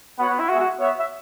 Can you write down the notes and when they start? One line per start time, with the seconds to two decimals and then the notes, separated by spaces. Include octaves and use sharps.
0.19 B3 F#4 C#5 F#5
0.29 B3
0.40 E4
0.49 G#3 B3 F#4 G#4 E5
0.60 F#4
0.79 B3 F#4 C#5 E5
1.00 E5